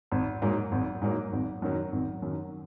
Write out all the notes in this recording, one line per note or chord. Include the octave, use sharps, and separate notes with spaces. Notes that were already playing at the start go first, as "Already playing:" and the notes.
G#1
G#2 F#3 A#3
G#1
G#2 F#3 A#3
G#1
F#2 D#3 F#3
G#1
F#2 D#3 F#3